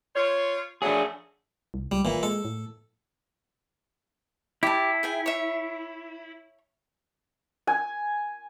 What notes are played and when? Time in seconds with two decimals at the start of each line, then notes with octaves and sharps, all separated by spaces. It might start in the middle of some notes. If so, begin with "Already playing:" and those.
0.15 F4 C5 C#5
0.82 F#3 A3 D4 G#4
1.74 C2
1.92 C#2 G3
2.05 G#1 A#2 E3
2.23 G#3 A4
2.45 A2
4.63 E4 G4 A5
5.03 G#4 G5 G#5
5.26 C#5 E5
7.67 G#5